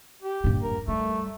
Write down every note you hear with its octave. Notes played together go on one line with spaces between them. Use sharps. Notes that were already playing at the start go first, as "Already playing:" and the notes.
G4
G2 A#3
A#4
G3 A3